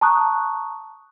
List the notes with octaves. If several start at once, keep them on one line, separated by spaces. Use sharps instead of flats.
A5 A#5 C#6 D#6 F#6